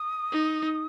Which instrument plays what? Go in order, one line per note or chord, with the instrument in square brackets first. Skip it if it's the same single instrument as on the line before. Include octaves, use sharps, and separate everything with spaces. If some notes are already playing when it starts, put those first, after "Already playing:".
Already playing: [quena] D#6
[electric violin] D#4